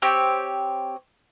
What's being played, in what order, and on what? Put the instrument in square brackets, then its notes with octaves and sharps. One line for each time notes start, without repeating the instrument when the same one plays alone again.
[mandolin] C4 G4 C#5